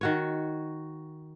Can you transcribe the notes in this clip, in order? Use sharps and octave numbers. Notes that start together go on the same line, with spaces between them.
D#3 F#4 C#5